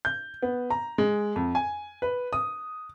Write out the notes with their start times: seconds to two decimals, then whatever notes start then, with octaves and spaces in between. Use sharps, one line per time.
0.05 G6
0.42 B3
0.70 A#5
0.98 G#3
1.36 F2
1.55 G#5
2.02 B4
2.33 D#6